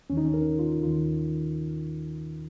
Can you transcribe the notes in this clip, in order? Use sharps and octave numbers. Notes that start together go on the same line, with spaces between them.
D#2 D#3 C#4
D#4
C#4
A#4
F4
D#2 D#3 F4